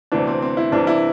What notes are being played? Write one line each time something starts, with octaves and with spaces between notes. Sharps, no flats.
D2 C3 E3 D4
C4
C4
E4
C2 C3 E3 D4
E4